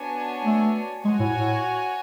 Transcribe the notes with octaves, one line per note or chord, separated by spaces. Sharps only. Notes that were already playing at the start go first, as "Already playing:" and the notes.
Already playing: B3 D4 F#4 C#5 G#5
A3
G#3 F#4 C#5 G#5
A2
A2